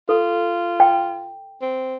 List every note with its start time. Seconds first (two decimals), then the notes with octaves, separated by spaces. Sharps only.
0.09 F4 A4
0.80 G5
1.62 C4